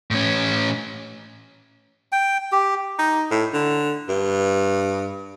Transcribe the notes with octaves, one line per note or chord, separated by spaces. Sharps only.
A2 C#4
G5
G4
D#4
A2
D3
G2